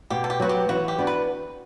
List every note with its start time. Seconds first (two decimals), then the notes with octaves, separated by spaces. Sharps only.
0.10 B2 G4
0.24 A4
0.30 G4
0.40 F#3 B3 F#4
0.49 G4
0.69 E3 F#4
0.88 G4
0.98 B3 D4 F#4
1.07 B4